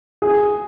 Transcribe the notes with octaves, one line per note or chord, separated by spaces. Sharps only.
G#4